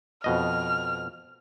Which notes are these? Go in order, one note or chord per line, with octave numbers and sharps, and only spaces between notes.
F2 B2 D#5 F6